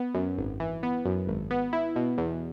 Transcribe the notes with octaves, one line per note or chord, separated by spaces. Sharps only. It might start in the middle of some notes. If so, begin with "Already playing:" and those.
Already playing: B3
F#2
G#1
E3
B3
F#2
G#1
B3
E4
B2
E2